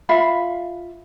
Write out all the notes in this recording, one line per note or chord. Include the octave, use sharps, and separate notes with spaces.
F4 E5 F5 B5